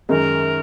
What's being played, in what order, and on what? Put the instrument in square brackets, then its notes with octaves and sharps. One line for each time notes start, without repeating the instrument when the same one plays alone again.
[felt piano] F#2 D#3 G#3 D#4 [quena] A#4